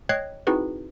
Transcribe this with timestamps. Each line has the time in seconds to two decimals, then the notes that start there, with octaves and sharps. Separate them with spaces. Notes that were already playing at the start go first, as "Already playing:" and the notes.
0.09 C#5 D#5 G5 F#6 G#6 C7
0.47 C4 D#4 E4 F#4 G#4 B4